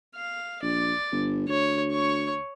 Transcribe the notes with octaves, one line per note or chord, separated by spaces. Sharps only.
F5
A#1 D5
G1
D2 C#5
C#5 C#6